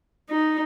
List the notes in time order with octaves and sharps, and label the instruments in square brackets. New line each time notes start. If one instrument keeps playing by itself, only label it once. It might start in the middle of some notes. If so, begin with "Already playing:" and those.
[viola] D#4